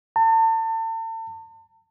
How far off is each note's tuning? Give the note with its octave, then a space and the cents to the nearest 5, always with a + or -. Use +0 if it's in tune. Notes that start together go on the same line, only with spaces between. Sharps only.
A5 +40